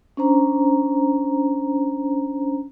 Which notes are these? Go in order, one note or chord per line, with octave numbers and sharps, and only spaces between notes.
C#4 D4 C5 A#5